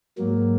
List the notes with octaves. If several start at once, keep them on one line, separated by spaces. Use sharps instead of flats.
G#2 F#3 A#3